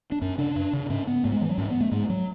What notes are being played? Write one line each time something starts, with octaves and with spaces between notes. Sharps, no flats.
D4
F#2 C#4
C#3 D4
F#2
C#3
G#2 C#4
B3
G#2 A3
G#3
E3
F#3
G#2 C#4
B3
A3
G#2 G#3
F#3